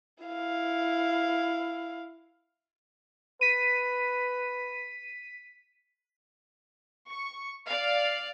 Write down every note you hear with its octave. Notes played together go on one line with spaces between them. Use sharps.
E4 F5
B4 B6 D#7
C#6
D5 F5